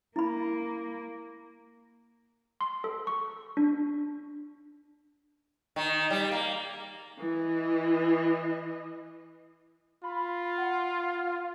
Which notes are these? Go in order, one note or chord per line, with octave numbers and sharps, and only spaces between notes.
A#3 E4 B5
C6
A4
C#6
D4
D#3
G3
A#3
E3 D#5
F4 B5
F#5
F6